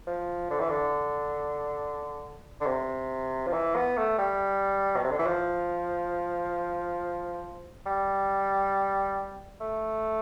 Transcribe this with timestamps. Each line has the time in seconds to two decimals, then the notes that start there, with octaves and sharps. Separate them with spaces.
0.07 F3
0.50 D3
0.60 E3
0.70 D3
2.61 D3
2.66 C3
3.46 F3
3.53 E3
3.75 B3
3.97 A3
4.18 G3
4.96 B2
5.04 C3
5.11 D3
5.19 E3
5.26 F3
7.86 G3
9.60 A3